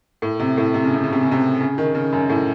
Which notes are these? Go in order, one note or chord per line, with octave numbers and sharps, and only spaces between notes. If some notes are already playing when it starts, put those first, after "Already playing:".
A2
C3
A2
C3
C#3
C3
C#3
C3
C#3
C3
C#3
D#3
C#3
F#2
A2